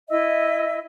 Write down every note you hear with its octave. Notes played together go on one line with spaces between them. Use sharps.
E4 D#5 E5 E6